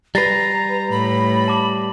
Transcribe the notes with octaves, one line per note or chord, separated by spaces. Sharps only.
G3 B4 A#5 A6 A#6 C7
A2 B5
A5 D6 F#7